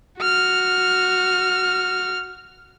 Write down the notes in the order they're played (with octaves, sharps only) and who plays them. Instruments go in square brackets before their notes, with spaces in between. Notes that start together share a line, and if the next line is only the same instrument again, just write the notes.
[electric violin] F#4 F6